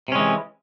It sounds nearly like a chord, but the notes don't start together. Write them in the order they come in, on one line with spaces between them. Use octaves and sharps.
C3 C#4 G#3 E3